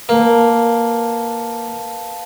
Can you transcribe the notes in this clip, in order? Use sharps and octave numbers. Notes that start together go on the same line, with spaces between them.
A#3 B4 F5 A5